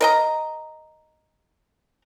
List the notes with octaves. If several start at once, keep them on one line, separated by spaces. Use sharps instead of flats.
A#4 D#5 A#5